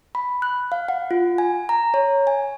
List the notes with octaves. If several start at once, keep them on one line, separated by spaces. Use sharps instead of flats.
B5
F#6
F5
F#5
F4
G#5
A#5
C#5
G#5